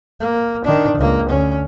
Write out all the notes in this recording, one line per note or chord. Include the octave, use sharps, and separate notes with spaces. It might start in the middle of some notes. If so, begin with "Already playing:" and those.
A#3
D#3 D4
C#2 A#3
D2 C#4